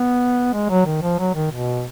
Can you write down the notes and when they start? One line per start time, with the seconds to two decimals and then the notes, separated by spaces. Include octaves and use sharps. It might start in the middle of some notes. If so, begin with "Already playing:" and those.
Already playing: B3
0.53 G#3
0.70 F#3
0.86 D#3
1.02 F3
1.19 F#3
1.35 D#3
1.51 B2